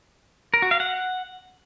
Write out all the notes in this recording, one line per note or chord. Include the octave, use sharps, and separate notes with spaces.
A#4
F#4
F5
F#5